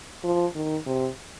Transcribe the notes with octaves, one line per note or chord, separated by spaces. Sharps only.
F3
D#3
C3